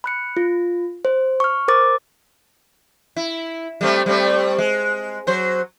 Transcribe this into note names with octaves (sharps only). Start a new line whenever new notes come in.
B5 F#6 C#7
F4
C5
C#6 F6
A#4 C5 D6 A6
E4
G3 A3 C4
G3 A3 C4
G#3
F#3 C5